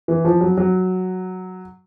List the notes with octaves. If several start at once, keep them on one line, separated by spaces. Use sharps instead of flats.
E3
F3
F#3
F#3